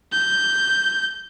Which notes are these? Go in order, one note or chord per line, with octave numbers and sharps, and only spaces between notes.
G6